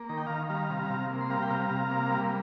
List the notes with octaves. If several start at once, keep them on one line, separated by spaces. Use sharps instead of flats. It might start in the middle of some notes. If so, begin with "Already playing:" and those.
Already playing: A#3
D#3 A#5
G5
D#3 F5 A#5
G3 F5 A#5
C3
C3
A#3
C6
G3 F5 A#5
G5
C3 F5 A#5
C3
A#3
G3